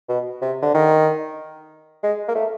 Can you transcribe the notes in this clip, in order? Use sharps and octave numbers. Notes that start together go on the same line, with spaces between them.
B2
C3
D3
D#3
G#3
A#3
A3